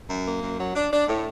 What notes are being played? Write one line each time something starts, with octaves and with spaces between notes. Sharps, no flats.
F#2
A#3
F#2
F#3
D4
D4
A2